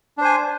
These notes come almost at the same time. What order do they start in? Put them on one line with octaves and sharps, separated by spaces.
D4 C5 G#5